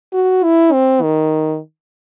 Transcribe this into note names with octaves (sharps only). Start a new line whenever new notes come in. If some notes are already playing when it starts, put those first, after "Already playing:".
F#4
E4
C4
D#3